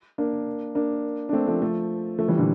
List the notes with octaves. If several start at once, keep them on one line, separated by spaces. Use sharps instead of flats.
A#3 D4
A#3 D4
D4
A3 C4
F3 A3
F3 A3
F3 A3
E3 G3
A#2 D3